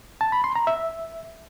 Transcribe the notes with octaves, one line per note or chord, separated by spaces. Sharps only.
A5
B5
C6
A#5
E5